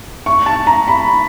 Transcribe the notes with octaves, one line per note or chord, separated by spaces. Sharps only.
C#6
A5
A#5
B5